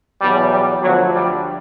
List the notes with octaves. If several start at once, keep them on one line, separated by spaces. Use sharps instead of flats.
E2 B2 F#3 G3
G3
D2 D3 F3 F#3
G3